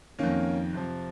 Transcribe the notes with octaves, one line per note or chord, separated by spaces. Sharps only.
F2 D#3 A#3 C#4
F2 C3 F3